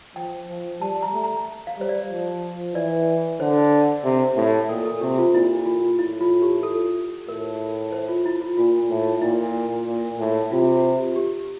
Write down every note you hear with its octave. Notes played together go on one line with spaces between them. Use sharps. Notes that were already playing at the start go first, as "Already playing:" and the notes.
F3 G5
F3
G3 A5
A#5
A3
A#5
F5
G3 C5
D5
F3
E3 D5
D3 C5
C3
A2
A#2 A4
A4
C3 G4
F4
A#2 E4
F4
A2 E4
F4
G4
A4
A2 A#4
C5
F4
E4
F4
A#2 F4
A2
A#2 E4
A#2
A2
C3 F4
G4